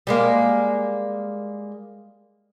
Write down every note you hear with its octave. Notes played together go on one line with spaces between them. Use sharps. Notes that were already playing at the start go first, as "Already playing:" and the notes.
G3 G#3 A#3